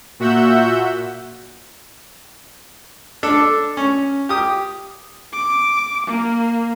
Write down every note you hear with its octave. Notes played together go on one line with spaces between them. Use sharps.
A#2 F#4 E5 F#5 E6 G6
D4 A4
C#4
G4 D#6
D6
A#3